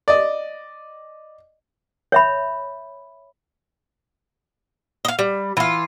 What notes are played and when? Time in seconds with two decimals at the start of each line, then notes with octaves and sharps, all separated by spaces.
0.08 D5 D#5
2.12 C#5 E5 B5
5.05 D#5 F5
5.19 G3
5.57 E3 F4